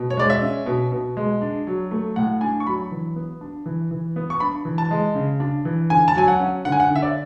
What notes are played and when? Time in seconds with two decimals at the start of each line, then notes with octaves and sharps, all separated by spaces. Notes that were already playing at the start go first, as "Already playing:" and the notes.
Already playing: B2
0.10 C#5
0.17 G#3 D5
0.30 E5
0.42 C#4
0.66 B2
0.92 B2
1.17 G#3
1.42 D4
1.67 F#3
1.91 A3
2.16 A2 F#5
2.41 D4 G#5
2.60 C#6
2.66 F#3 B5
2.91 E3
3.16 B3
3.41 D4
3.66 E3
3.91 E3
4.16 B3
4.30 C#6
4.40 D4 B5
4.65 E3
4.78 A5
4.91 G#3
5.15 C#3
5.40 D4
5.65 E3
5.90 D3 G#5
6.08 A5
6.15 F#3 G#5
6.28 F#5
6.40 C#4
6.65 D3 F#5
6.72 G#5
6.80 F#5
6.91 D3 E5
7.02 D5